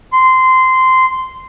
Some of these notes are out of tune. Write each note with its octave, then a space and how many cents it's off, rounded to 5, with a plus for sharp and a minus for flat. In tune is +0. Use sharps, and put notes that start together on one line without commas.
C6 -15